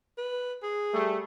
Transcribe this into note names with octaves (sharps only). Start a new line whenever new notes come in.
B4
G#4
G3 A3